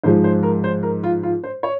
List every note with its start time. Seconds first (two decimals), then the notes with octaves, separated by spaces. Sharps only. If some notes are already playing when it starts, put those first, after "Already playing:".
0.04 G#2 F3 G#3 C5
0.24 C5
0.43 A#4
0.64 C5
0.83 A#4
1.04 F4
1.23 F4
1.44 C5
1.63 C#5